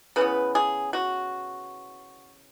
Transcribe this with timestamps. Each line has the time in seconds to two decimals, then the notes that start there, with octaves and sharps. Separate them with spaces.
0.16 C#3 E3 B3 B4
0.55 G#4
0.93 F#4